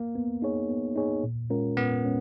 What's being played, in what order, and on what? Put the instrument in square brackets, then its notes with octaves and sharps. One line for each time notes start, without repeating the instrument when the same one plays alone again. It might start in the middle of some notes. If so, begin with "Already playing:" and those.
Already playing: [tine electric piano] A#3
[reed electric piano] B3
D#4 G#4 C#5
B3
D#4 G#4 C#5
A#2
G#3 C#4 F4 A#4
[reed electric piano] A#2 [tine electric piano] B3
[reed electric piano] G#3 C#4